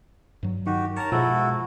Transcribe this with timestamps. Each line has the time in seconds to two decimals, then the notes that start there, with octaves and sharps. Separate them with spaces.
0.43 G2 F#3
0.66 D#3 F#4 G4
0.96 A#4 C#5 A5 A#5
1.12 B2 F3 G#3 E4 F#4 A4